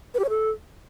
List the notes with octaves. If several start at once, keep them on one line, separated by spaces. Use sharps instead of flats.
B4
G4
C#5
A4